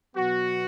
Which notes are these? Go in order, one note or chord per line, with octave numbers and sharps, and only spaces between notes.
B2 F#3 B3 F#4